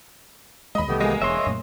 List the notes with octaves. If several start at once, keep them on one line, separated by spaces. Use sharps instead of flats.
D#2 G#3 D#5 B5
C2 D#3 E3 A3 B3 G4
G#3 A#3 D#5 G#5
E1 C#5 D#5 E5 C6
F#2 A#2 A3